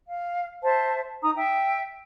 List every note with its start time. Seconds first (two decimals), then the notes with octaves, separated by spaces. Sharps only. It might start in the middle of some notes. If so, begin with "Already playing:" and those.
0.07 F5
0.63 C5 E5 A5
1.22 D#4 A#5 D#6
1.36 E5 G5